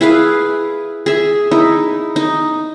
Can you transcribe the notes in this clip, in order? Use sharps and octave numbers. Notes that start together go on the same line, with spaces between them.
E4 G#4 B4 F5
G#4 E5
D#4 E4
D#4